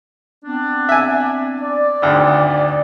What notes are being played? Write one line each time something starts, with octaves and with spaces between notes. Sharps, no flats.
B3 C4 D4
E5 G#5
D5
G#1 D2